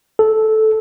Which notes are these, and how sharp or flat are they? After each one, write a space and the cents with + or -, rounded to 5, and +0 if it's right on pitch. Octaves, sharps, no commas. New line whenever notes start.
A4 -10